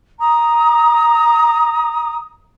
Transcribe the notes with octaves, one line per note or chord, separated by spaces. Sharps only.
A#5 D#6